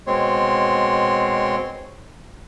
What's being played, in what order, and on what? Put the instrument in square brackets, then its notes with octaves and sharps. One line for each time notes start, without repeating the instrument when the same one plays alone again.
[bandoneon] B2 G#3 C4 C#5 C6